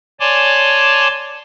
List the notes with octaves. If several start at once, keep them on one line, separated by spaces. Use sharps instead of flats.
C#5 D5 G#5 A5 C6 D6